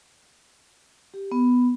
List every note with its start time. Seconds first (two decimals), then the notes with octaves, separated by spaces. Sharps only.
1.14 G4
1.32 B3